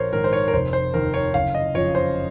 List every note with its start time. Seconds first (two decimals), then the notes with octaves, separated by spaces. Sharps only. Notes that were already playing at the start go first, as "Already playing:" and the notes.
Already playing: A#1 A#4 C5 C#5
0.12 G#2 D#3 A#4
0.24 C5
0.33 C#5
0.48 A#4
0.53 F1 C5
0.73 C5
0.94 D#2 D#3 A#4
1.14 C#5
1.34 F#1 F5
1.54 D#5
1.75 F2 C#3 F3 C#5
1.95 C5